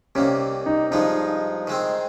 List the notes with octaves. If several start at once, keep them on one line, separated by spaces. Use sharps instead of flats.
C2 C3 D#3 A#3 C#4
D#4
G2 F3 G#3 D#4
D#3 G#3 C4